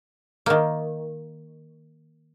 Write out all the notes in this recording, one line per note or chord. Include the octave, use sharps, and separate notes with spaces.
D#3 A#3